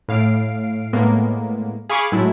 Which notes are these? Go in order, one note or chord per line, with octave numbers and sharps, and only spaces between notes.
A2 F5 C7 D7
A2 G#3 A#3 B3
G#4 F5 G#5 B5 C#6 D6
A2 F#3 G#3 A3 E4